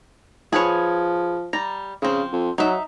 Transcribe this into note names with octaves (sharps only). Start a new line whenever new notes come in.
F3 G#4 B4 C#5
G3 A#5
C#3 F3 C4
F2
F#3 D#4 E5